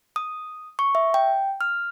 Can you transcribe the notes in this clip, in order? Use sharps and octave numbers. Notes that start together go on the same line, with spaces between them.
D#6
C#6
E5
G5
F6